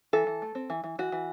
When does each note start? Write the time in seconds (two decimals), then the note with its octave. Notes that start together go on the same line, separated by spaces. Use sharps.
0.13 E3 A4
0.27 E3
0.42 A3
0.55 C4
0.70 E3
0.84 E3
0.99 E3 F#4
1.12 E3